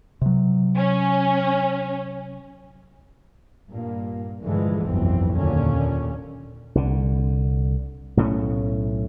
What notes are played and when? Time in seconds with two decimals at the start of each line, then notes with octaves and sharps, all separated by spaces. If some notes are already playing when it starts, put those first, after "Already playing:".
0.21 C3 F#3
0.77 C#4
3.70 G2 A#2 A#3
4.43 G2 A#2 D3 E3 F3 G#3
4.84 F1 B1 E2 G2 E3 C4
5.31 D#2 A#2 D3 C#4
6.75 C2 D3
8.17 B1 A2 A3 C#4